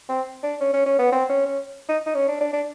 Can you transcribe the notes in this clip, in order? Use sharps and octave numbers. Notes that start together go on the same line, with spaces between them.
C4
D4
C#4
C#4
C#4
B3
C4
C#4
C#4
D#4
D#4
C#4
D4
D4
D4